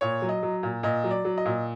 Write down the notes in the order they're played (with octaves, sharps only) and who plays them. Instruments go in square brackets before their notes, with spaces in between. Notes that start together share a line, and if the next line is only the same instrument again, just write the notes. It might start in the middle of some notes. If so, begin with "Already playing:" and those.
[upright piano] A#2 C#5
F#3
D#5
F#3
A#2
A#2 D#5
F#3
D5
F#3
D#5
A#2